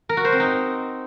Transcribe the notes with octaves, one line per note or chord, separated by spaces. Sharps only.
A#4
F#4
C5
C4
D#4